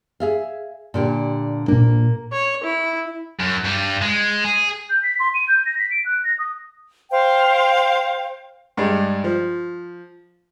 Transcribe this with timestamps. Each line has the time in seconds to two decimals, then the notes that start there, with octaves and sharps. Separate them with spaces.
0.20 G#4 E5 F5
0.94 A#2 D3 G4
1.68 A#2 A#3 D4
2.32 C#5
2.63 E4
3.40 F#2
3.64 G2 G3
4.02 G#3
4.44 G#4
4.90 G6
5.03 B6
5.20 C6
5.34 D#7
5.48 G6
5.66 A#6
5.79 B6
5.91 D7
6.06 F#6
6.24 A#6
6.39 D#6
7.11 C5 F5 G5
8.77 G2 G3 G#3
9.24 F3